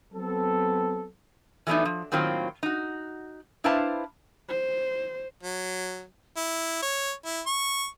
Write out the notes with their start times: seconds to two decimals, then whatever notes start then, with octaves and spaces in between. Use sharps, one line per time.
0.13 F#3 B3 C4 A4
1.67 E3 F#3 A3 B3 D4 D#4
1.85 F3
2.12 A2 D#3 F#3 A#3 C4 F4
2.63 D#4 F#4
3.64 D4 E4 B4 C5 F5 A5
4.49 C5
5.43 F#3
6.36 E4
6.82 C#5
7.25 E4
7.46 C#6